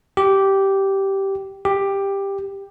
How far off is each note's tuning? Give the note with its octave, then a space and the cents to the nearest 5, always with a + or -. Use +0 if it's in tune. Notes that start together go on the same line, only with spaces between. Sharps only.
G4 -10
G4 +10